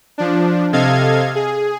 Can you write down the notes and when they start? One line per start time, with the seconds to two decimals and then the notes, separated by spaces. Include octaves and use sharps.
0.18 F3 D4
0.73 C3 A4 D#5 F5 G#6
1.35 G#4